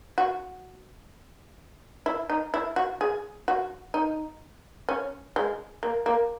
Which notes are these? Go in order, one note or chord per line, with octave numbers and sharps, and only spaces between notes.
F#4
E4
D#4
E4
F#4
G#4
F#4
D#4
C#4
G#3
A#3
A#3